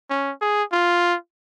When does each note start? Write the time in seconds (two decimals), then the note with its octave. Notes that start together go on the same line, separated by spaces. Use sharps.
0.10 C#4
0.42 G#4
0.72 F4